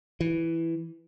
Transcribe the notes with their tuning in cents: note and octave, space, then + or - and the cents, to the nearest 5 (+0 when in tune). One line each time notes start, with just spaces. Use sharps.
E3 +5